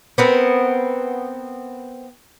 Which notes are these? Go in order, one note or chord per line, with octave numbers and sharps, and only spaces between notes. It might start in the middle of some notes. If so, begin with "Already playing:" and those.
B3 C4 A#4